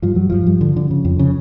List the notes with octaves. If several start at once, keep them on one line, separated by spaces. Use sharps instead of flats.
G2 F3
G2 F#3
G2 F3
G2
D3
D3
C#3
F2
C#3